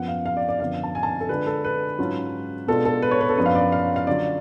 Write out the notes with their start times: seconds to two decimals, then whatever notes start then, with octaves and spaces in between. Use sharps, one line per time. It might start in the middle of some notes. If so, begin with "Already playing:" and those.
Already playing: F#2 F3 B3 F#5
0.08 F5
0.26 F5
0.37 D5
0.49 D5
0.60 F#2 D3 F3 B3 F5
0.83 A5
0.95 G#5
1.03 A5
1.21 A4
1.29 D3 G#3 D4 F4 B4
1.47 A4
1.64 B4
1.99 G#2 F#3 C#4 F4
2.68 B2 G#3 B3 D4 F4 A4
2.85 A4
3.02 B4
3.11 C#5
3.21 B4
3.29 A4
3.38 F#2 F3 B3 D4 F4 B4
3.46 F5
3.55 D5
3.72 F5
3.96 F5
4.07 D3 F#3 C#4 F4 D5